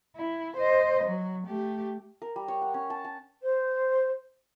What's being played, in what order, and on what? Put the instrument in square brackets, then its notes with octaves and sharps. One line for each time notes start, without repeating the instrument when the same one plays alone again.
[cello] E4
C5 D#5
F#3
A3 G4
[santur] A#4
G3
C#5
F#5
C#4
A5
A5
[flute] C5